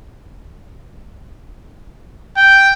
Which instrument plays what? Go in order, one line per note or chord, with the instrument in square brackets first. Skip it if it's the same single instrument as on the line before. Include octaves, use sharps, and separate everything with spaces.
[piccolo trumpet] G5